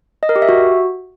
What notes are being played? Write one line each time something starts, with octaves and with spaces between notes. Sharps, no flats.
D#5
A#4
G4
E5
F#4